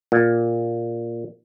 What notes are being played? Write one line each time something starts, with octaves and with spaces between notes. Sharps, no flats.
A#2